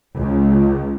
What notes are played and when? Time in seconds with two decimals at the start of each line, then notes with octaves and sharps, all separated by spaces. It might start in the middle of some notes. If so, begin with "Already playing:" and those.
0.18 C#2